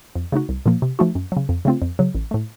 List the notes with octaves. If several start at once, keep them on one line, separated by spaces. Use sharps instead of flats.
F2
C#3 A3 D#4 F#4
C2
A#2 F3 A#3
C3
F3 A3 D#4 F#4
F#2
C#3 F#3
F2
C#3 A3 C4 F4
F2
C#3 F#3
A1
A2 A3